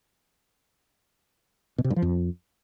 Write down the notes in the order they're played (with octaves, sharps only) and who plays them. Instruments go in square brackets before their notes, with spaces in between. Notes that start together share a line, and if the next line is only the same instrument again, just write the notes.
[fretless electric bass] B2
C3
G2
F3
F2